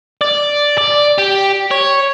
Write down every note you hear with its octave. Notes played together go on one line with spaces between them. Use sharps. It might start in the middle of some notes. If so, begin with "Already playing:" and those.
D5
D5
G4
C#5